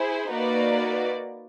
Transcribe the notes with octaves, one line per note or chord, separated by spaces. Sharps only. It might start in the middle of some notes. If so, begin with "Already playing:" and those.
Already playing: E4 G#4 C5
A#3 D#4 F#4 B4 D5